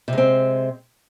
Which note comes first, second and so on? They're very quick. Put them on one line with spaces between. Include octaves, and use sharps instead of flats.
C3 G#3 C4